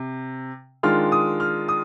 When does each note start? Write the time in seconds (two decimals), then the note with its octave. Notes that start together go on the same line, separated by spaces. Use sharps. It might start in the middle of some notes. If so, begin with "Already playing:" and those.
Already playing: C3
0.83 D#3 G#3 D4 F4 F6
1.12 D#6
1.40 F6
1.68 D#6